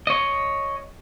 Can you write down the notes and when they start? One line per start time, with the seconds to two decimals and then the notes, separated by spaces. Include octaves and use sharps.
0.07 C#5 D#5